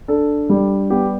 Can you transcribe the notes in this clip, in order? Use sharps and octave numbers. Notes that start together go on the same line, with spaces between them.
D4 A4
G3
B3 G4